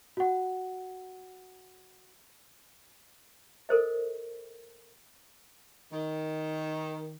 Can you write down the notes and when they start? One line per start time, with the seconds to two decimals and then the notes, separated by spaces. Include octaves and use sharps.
0.17 F#4 F#5
3.69 A4 A#4 C5 D#5
5.92 D#3